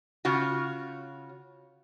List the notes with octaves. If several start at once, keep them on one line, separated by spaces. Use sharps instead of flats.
C#3 F4 F#4